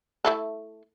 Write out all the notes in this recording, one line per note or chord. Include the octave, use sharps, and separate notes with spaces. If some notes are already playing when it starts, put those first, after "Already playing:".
A3 E4 A4